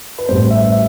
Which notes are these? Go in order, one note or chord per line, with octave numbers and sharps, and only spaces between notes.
B4
A1 A2 G3 C5
E5
E5